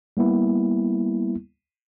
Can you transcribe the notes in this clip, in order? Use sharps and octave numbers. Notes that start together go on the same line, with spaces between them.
G3 A#3 B3 E4